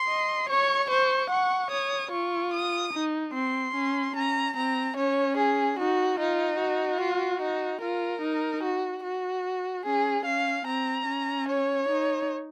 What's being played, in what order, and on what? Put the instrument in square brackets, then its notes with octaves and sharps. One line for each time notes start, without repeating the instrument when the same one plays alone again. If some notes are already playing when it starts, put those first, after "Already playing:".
Already playing: [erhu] C6
[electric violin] D#5
[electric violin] C#5 [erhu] C#6
[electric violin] C5 [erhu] C#6
[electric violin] F#5 [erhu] C#6
[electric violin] C#5 [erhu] D#6
[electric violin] F4 [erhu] C#6
[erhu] D#6
[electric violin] D#4
[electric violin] C4 [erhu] C6
[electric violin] C#4
[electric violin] C#4 [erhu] A#5
[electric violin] C4 [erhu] A#5
[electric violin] C#4 [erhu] C#5
[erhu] G#4
[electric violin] D#4 [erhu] F#4
[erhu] D#4 [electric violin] F4
[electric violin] F#4
[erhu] F4
D#4
[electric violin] F4 [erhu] A#4
[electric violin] D#4
[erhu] F#4
F#4
[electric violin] C#4 [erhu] G#4
[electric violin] C#4 [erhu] F5
[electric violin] C4 [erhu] A#5
[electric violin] C#4
[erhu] C#5
[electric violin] D#4